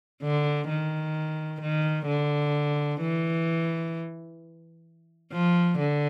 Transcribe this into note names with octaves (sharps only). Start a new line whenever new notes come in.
D3
D#3
D#3
D3
E3
F3
D3